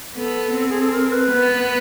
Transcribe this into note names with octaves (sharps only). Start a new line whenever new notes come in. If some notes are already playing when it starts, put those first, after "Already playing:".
B3 A4
C4
G#4
A4
A#4
B4
B3